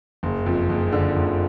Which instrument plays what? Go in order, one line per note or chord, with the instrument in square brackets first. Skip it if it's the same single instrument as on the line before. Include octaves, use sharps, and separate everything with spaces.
[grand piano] F#1
F2
F#1
D3
F#1